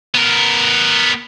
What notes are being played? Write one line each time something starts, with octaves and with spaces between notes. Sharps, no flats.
B3 A#4